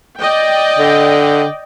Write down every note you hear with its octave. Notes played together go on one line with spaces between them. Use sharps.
D5 D#5 G5
D3